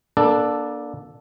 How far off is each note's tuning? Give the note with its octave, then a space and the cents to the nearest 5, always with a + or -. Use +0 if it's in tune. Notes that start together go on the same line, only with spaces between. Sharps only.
A#3 +30 D4 +0 A4 +0